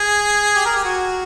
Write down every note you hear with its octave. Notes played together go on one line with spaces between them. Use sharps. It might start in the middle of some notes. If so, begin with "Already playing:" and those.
Already playing: G#4
G4
A#4
G4
F#4